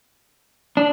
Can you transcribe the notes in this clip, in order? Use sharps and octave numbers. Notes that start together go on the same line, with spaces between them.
D4